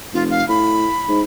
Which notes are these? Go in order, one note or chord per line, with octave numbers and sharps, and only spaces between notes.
F1 F4
F5
A2 B5
G#2